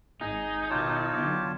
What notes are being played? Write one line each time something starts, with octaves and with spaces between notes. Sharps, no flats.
G#1 D#4 G#4
B2 D#3 F4 G4 C#5 A5
D3 F#3 B3 G4